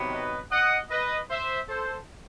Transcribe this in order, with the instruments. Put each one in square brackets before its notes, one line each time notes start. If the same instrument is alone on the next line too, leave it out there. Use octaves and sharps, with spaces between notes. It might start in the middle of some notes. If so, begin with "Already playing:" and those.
Already playing: [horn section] C3 D#3 F#3 B3
B4 D#5
D#5 F#5
B4 D#5
C5 E5
A4 C5